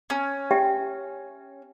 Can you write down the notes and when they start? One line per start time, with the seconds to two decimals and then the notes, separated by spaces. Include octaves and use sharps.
0.10 C#4
0.51 G4 E5 G5